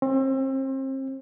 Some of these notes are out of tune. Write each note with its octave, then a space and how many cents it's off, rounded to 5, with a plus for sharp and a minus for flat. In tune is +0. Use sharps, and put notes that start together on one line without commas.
C4 +35